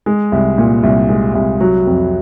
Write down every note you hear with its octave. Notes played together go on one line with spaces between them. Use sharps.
G#3
C2
A#2
C2
G#3
C2
F#3
F2